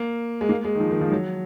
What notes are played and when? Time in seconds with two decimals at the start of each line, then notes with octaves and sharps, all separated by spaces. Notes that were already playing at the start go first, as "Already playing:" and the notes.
Already playing: A#3
0.41 G#3
0.49 A#3
0.65 G#3
0.75 D#3
0.80 F3
0.91 D#3
1.01 F3
1.12 F#3